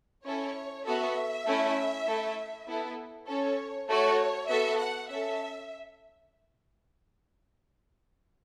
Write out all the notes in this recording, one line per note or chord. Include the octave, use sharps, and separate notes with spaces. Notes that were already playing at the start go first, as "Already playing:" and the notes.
C#4 E4 A4 C#5
B3 F#4 A4 E5
A3 C#4 E4
A3 E4 A4
B3 E4 A4
C#4 A4 C#5
A3 F#4 A4 C#5
B3 F#4 A4 E5
F#5
C#4 A4 E5